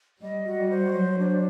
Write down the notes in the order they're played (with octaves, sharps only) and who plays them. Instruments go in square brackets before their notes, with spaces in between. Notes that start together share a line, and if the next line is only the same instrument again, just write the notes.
[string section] G3 [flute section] D#5
[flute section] F#4
[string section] G3
[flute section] C5
[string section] F#3 [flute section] C#5
[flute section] D4